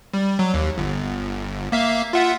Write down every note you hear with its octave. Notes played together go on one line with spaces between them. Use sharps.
G3
F#3
D#2
G1
A#3 E5 F5
F4 E5 F#5